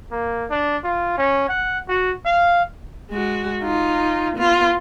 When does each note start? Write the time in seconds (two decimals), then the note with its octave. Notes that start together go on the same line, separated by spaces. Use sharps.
0.11 A#3
0.50 D4
0.84 F4
1.18 C#4
1.49 F#5
1.88 F#4
2.26 F5
3.11 G#3 F#4
3.63 D#4 F4
4.37 B3 F4